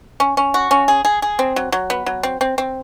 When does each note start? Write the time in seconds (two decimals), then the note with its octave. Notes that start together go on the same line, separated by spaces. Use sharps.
0.20 C#4
0.37 C#4
0.54 F#4
0.71 C#4
0.88 G#4
1.05 G#4
1.22 G#4
1.39 C4
1.56 F#3
1.72 F#3
1.90 B3
2.06 F#3
2.23 C4
2.41 C4
2.58 C4